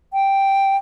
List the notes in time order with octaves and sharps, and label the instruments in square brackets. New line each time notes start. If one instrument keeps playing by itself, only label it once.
[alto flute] G5